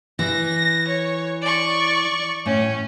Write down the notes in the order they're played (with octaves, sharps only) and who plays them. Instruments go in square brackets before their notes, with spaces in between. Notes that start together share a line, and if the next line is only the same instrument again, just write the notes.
[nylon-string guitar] E3 [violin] A#6
[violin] C#5
D5 C#6
[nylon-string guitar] A2 [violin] C#4